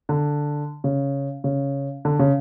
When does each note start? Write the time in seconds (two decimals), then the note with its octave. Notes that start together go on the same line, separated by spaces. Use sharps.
0.09 D3
0.84 C#3
1.44 C#3
2.05 D3
2.19 C#3